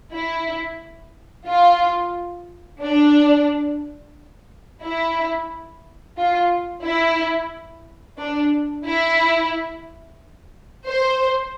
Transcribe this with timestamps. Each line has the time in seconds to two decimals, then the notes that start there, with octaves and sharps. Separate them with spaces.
0.13 E4
1.47 F4
2.81 D4
4.82 E4
6.17 F4
6.84 E4
8.18 D4
8.85 E4
10.86 C5